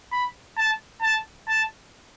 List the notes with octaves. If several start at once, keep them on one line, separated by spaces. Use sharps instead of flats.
B5
A5
A5
A5